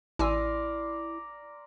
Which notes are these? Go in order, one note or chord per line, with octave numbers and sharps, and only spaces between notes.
A1 E4 A#4 D5 G#5 C6 E6